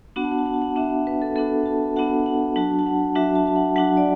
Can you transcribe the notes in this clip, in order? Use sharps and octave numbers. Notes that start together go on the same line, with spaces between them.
B3 D4 F#4 F#5
A5
F#5
A5
F#5
A5
F#5
B3 D4 F#4 E5
B4
A4
B3 D4 F#4 A4
A5
B3 D4 F#4 F#5
F#5
F#3 D4 F#4 A5
A5
F#5
F#3 D4 F#4 E5
A5
A5
F#5
F#3 D4 F#4 F#5
D5